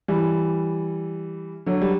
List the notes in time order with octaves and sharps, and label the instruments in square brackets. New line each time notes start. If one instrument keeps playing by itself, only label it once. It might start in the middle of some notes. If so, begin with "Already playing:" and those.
[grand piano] E3 G3
D3 F#3
G3